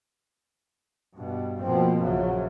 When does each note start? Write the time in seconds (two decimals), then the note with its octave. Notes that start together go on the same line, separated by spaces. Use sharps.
1.15 G2 B2
1.60 B2 F3 A#3 C4
1.99 A#1 F#2 C#3 F#3